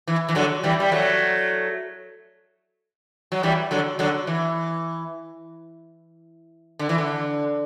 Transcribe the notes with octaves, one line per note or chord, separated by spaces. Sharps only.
E3
E3
D3 F#3
E3 G3
G3
F#3 A3
F#3
E3 G3
D3 F#3
D3 F#3
E3
D3
E3
D3